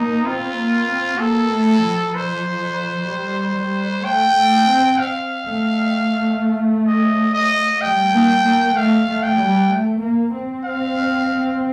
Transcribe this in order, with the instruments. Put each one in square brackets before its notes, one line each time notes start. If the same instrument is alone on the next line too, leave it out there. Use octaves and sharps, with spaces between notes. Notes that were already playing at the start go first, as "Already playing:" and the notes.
Already playing: [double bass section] A#3 [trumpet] D#4
[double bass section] C4 [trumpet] F4
[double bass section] A#3
C4
[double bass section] A#3 [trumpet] A4
[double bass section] A3
F3
[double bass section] F3 [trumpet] C5
[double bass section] G3
G3
[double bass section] A3 [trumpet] G5
[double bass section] A3
C4
[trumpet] F5
[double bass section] A3
[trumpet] D#5
D#5
[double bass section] G3 [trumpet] G5
[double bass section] A#3
A#3
[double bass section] A3 [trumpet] F5
[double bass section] A3
[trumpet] G5
[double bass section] G3
A3
A#3
C4
[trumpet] F5